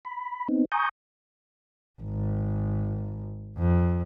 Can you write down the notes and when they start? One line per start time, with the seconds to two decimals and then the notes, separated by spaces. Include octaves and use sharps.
0.05 B5
0.48 B3 C4 D#4
0.72 G#5 A#5 C#6 D#6 G6
2.02 G#1
3.58 F2